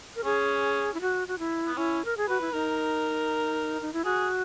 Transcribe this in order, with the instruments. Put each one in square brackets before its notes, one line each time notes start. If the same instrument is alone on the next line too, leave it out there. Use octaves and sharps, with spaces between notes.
[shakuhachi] A#4
[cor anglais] C#4 [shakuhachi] G#4
[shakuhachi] E4
F#4
F#4
E4
[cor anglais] B3
[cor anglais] C#4 [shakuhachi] E4
[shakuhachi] A#4
G#4
[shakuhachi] F#4 [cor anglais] B4
[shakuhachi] E4
[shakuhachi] D#4 [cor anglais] A#4
[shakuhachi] D#4
E4
[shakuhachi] F#4 [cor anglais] G#4